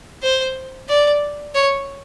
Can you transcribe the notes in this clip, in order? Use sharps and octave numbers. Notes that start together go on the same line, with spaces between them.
C5
D5
C#5